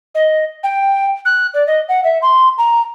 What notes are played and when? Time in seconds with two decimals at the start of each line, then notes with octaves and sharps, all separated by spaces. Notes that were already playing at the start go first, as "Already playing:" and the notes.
0.15 D#5
0.63 G5
1.25 F#6
1.54 D5
1.67 D#5
1.89 F#5
2.04 E5
2.22 C6
2.58 A#5